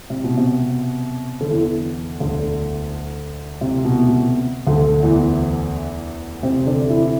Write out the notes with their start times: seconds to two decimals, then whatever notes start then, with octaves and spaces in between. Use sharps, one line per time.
0.10 C3
0.24 B2
0.37 C3
1.40 D3
1.50 E2 E3
2.20 D2 D3
3.61 C3
3.84 B2
4.08 B2
4.67 D2 D3
5.03 E2 E3
6.43 C3 C4
6.66 D3 D4
6.90 E3 E4